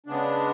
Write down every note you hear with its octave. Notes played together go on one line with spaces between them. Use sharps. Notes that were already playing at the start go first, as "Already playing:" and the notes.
C#3 G#3 B3 D4